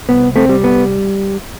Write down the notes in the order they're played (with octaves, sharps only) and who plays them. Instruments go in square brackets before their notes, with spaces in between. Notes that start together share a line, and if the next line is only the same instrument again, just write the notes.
[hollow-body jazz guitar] C2 B3
A3 C4
G3
B3